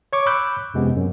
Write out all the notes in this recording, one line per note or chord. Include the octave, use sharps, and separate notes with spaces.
C#5 C#6 D6
B5 D6 E6 F#6 G6
F2 C3 G#3 B3 C#4
F#2